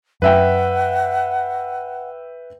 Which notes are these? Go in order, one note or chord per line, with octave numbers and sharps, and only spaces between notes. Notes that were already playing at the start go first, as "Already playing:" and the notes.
F#2 B4 E5 F#5 G5